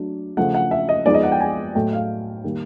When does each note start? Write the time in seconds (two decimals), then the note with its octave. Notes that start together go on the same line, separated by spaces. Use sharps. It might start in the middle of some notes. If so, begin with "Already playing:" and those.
Already playing: F#3 A3 D4
0.37 C#3 F3 A3 F#5
0.55 F#5
0.71 E5
0.89 D#5
1.06 F3 G#3 B3 D#4 D5
1.14 D#5
1.23 F#5
1.32 G5
1.41 G#5
1.75 A2 F#3 A3 G5
1.93 F5
2.44 D#3 G3 A#3 D#4